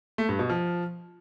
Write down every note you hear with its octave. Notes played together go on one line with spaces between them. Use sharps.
A3
G2
B2
F3